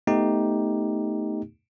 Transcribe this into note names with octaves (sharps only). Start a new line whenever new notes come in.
A3 B3 D#4 G4